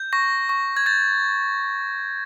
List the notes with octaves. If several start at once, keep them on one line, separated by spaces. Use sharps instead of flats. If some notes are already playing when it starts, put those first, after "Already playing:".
Already playing: G6
C#6 A#6
C#6
G#6
G6 A6